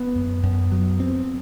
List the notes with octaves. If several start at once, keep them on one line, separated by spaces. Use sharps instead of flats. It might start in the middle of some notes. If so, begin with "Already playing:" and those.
Already playing: B3
F#2
F#2
F#3
C4